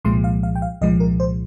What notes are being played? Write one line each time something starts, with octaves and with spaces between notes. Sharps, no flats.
C2 A#2 F3 G#3 C6
F5
F5
G5
F5
C2 A#2 F3 G#3 D#5
A#4
C5